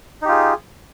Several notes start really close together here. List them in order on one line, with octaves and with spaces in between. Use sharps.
D#4 G4 F4 G#4